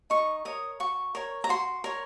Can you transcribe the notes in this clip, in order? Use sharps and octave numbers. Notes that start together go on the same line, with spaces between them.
D#4 C#6
A#4 C#5 D#6
F#4 C#6
A#4 C#5
A#5
F#4 C6
A#4 C#5